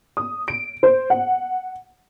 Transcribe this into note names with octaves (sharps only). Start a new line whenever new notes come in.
D#6
D7
C5
F#5